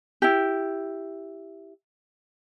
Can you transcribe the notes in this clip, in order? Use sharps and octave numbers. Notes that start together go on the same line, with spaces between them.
E4 G4